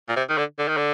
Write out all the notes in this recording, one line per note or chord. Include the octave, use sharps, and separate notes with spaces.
A#2
C3
D#3
D3
D3
D#3
D3